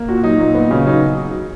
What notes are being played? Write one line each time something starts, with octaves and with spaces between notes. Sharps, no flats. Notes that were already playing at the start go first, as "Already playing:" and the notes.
Already playing: A#3
A#2 F#4
F#3 D#4
A#2
B3
C#3
F#3 D#4